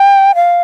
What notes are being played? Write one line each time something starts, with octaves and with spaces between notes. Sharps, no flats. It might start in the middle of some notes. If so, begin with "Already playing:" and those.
Already playing: G5
F5